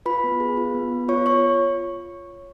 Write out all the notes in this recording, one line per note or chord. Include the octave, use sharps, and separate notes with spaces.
F4 B4 B5
B3
G#4
F4
B3
B3
F4 C#5 C#6
F4 C#5 C#6